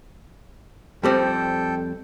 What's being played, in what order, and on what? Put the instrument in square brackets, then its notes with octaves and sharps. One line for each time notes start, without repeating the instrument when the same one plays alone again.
[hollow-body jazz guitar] F2 G3 C4 [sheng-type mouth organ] A4 G5